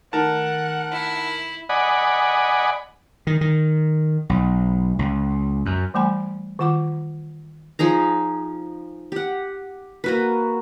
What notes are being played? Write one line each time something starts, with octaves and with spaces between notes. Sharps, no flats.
D#3 A3 D#4 A#4 F#5 A5
E4
D5 D#5 F#5 G#5 B5
D#3
D#3
B1
C#2
F#2
E3 G3 A3 G#5 B5
D#3 F4 F#5 C#6 D6
F3 D#4 G#4 A#5
G4 F#5
A#3 F#4 B4